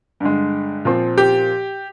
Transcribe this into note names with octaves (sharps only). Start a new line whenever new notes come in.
G2 D3 G#3
A#2 F3 C4
G4